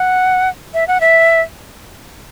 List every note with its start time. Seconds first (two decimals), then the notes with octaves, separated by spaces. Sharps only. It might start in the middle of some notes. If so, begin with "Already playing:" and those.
Already playing: F#5
0.74 E5
0.88 F#5
1.01 E5